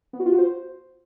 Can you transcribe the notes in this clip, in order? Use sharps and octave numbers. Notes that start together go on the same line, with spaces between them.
B3
F#4
F4
F#4
C5